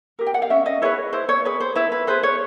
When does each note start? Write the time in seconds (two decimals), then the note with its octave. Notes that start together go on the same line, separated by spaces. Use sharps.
0.19 G4 A#4
0.27 G5
0.34 F#5
0.42 F5
0.50 C#4 E5
0.66 D#5
0.82 E4 G#4 B4 C#5
1.13 E4 C5
1.29 C#5
1.45 G#4 B4
1.60 C5
1.75 E4 B4
1.92 B4
2.07 G#4 B4 C5
2.23 C#5